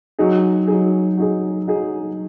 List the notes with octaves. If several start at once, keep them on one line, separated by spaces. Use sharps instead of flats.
F#3 D#4 G#4
F#3 D#4 G#4
F#3 D#4 G#4
F#3 D#4 G#4